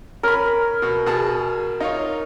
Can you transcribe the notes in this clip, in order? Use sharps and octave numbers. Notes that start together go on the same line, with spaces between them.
C#4 A#4 B5
B2
B2 G#4 A5
D#4 F4 C#5